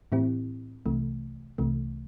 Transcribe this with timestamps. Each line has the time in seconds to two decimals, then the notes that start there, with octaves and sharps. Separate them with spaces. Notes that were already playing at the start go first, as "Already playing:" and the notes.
0.12 A2 E3 C4 E4 G4
0.86 C2 C3 E3 A3
1.58 C2 C3 E3 A3